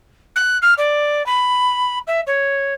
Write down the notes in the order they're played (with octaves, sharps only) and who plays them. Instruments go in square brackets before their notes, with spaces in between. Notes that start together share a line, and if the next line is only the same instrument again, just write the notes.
[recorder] F#6
F6
D5
B5
E5
C#5